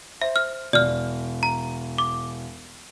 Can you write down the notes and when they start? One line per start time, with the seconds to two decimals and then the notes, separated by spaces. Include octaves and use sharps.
0.22 C5 E5
0.36 F6
0.73 E1 D5 F6
1.43 A#5
1.98 D6